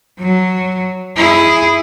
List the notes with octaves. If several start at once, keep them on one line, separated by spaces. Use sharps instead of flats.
F#3
E4 G#4